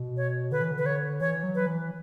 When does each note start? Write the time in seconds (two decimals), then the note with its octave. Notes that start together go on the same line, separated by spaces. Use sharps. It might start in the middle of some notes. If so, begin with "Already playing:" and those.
Already playing: B2
0.17 C#5
0.52 D3 B4
0.61 E3
0.71 D3
0.78 B4
0.86 C#5
1.20 E3 C#5
1.43 F#3
1.55 B4
1.67 E3